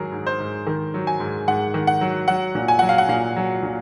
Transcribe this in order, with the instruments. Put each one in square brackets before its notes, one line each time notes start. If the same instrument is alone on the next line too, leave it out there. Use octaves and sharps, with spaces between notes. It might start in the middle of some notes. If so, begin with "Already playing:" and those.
Already playing: [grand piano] G#2 D#3 F#3 G#4 A#4
G#2
C5
G#2
D#3
F#3
G#5
G#2
G#2 F#5
D#3
F#5
F#3
F#3 F#5
A#2
G#5
F#3 F#5
F5
F#5
A#2 F5
F#3
A#2